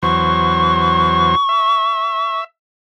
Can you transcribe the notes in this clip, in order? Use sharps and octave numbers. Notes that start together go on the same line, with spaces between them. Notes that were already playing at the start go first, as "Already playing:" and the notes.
E2 F#3 C5 C#6
E5